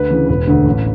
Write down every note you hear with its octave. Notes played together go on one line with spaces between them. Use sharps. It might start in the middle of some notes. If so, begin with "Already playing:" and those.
Already playing: D2 B4
C#3 E3
E1 B4
D2 D3
A1